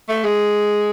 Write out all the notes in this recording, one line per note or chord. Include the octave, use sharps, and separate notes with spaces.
A3
G#3